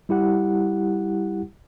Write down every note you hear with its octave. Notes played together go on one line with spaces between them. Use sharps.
G3 E4 G4 F#5